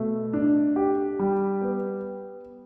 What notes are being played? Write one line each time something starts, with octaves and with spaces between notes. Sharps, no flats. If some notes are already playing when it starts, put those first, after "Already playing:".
Already playing: B2 A3
D4
G4
G3
B3